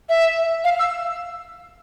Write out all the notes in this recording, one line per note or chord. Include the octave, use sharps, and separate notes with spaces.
E5
F5
E6